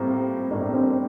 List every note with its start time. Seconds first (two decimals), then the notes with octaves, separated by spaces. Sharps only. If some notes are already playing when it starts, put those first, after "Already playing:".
Already playing: A2 G3 A#3 C4 F4 A#4
0.50 A2 G3 A#3 D4
0.74 C4